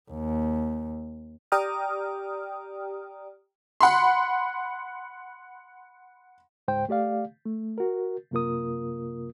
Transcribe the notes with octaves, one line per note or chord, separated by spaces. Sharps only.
D#2
G4 D5 G5 A#5 D#6 F6
F#5 B5 C6
C#2 G#2 C5 G5
A3 G4 D5 F5
A3
F#4 A#4
F#2 C3 A#3 F4 A#4 D#6